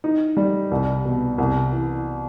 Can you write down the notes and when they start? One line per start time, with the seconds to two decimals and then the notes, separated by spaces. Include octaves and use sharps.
0.04 D#4
0.37 G3
0.71 C2
1.05 B2
1.38 C2
1.72 E3